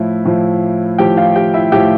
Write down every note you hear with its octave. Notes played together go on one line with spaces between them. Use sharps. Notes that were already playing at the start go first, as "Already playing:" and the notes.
Already playing: A2 F3 E4
A2 F3
A2 F3 G4 G5
F4 F5
G4 G5
E4 E5
A2 F3 G4 G5